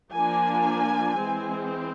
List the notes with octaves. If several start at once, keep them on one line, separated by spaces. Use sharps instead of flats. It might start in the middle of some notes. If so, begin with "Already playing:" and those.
F3 A#3 D4 G#5
E3 G#3 C4